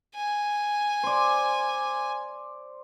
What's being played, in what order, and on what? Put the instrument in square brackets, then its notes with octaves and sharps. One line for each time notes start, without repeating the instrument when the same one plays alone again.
[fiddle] G#5
[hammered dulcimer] C5 D5